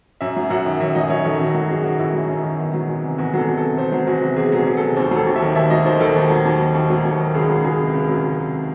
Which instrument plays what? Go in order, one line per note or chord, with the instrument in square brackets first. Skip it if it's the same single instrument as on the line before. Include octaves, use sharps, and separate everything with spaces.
[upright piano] F#2 E5
F#3
F#2 F#5
D#3
F#2 E5
F#3 D#5
F#2 C#5
D#3 A4
F#2 F#4
F#3 F#4
F#2 G#4
D#3 F#4
F#2 E4
F#3
F#2
D#3
E2
F#3
E2
C3
E2 F#4
F#3 A4
E2
A4
C3
E2 C5
F#3
E2 F#4
C3
E2 G#4
F#3 G#4
E2
A4
C3
D#2 C5
F#3
A4
D#2
E5
D#3
D#2 E5
F#3 D#5
D#2 C5
D#3 A4
D#2
F#3
D#2
D#3
D#2
F#3
D#2
D#3
C#2 G#4
F#3
C#2 G#4
C3
C#2
F#3
C#2
C3